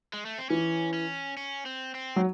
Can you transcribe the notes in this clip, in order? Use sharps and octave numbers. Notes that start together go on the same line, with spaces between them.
G#3
A3
C4
E3 C#4
C#4
C#4
C4
C4
F#3